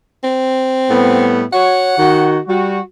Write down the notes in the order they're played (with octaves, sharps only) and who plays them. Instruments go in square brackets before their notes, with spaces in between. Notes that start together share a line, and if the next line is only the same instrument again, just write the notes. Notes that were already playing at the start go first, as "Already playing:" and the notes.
[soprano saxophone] C4
[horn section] A2 G3 B3
[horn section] F#4 C#5 [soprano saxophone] F#5
[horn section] D#3 F#4
G3 F#4